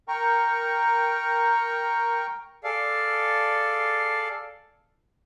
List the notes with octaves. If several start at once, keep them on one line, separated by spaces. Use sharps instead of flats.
A#4 G5 A#5 C#6
G#4 A4 D5 F5